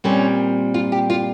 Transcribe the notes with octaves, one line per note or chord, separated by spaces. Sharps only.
A#2 G3 C4 C#4
F4
G4
F4